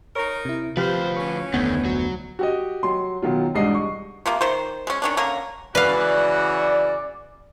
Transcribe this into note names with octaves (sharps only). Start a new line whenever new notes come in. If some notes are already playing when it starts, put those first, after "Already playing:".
D#4 A#4 C#5 A#5 C#6
C3 E4
D2 G2 C3 F3 G4 B4 C5 F6
E3 C#4 C#6
F1 D2 D#3 A3 B3 G6 G#6
F#3 F#4
F#4 G4 D#5
F#3 C6
B2 D#3 F#3 F4
E1 C2 G#2 D4 D#5 C7
C#6
C3 F3 A#3
D#3 C5
G#3 C#4
D#3 C#4 D4
D3 A#3 C#4 A#4
C#3 E3 F#4 B4 D5 F5